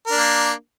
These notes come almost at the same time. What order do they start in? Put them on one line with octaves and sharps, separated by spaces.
A#4 D4 A#3